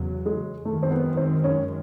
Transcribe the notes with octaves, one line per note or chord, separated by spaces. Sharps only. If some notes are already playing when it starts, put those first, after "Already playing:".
Already playing: E2 C#3 F#3
G#3
F#2 D#3 G#3 A3
C4
B3
C4
C#4